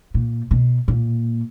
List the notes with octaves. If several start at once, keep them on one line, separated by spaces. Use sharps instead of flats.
A#2
B2
A#2